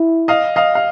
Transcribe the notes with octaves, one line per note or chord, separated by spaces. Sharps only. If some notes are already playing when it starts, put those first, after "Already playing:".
Already playing: E4
D#5 F5
D#5 F5
F5